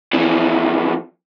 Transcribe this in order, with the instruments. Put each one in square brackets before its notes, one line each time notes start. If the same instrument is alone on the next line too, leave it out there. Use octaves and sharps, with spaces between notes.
[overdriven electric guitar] F2 E3